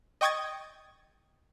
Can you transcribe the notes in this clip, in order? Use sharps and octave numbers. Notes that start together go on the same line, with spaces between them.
D#5 G5 C#6 D#6 G#6 A6